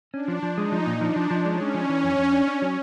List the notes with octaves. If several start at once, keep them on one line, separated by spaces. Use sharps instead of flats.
C#4 D4
F3
F3
G#3 D#4
F3
A#2
F3 D4
F3
F3
G#3 C#4
G#3
F3
E3
F2
F2
D4
D4
F#3